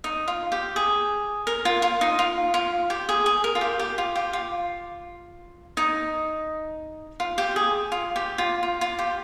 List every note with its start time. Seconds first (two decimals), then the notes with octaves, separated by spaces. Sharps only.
0.04 D#4
0.28 F4
0.52 G4
0.76 G#4
1.47 A#4
1.65 F4
1.82 F4
2.01 D#4
2.19 F4
2.54 F4
2.90 G4
3.09 G#4
3.26 G#4
3.44 A#4
3.55 F4
3.61 G4
3.79 G4
3.98 F4
4.16 G4
4.33 F4
5.77 D#4
7.20 F4
7.38 G4
7.56 G#4
7.92 F4
8.16 G4
8.38 F4
8.63 F4
8.81 F4
8.99 G4